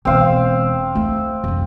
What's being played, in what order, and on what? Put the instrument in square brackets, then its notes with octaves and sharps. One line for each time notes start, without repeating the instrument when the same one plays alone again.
[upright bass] E1 E2 [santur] C4 F5
[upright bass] A3 E4
F2 D#3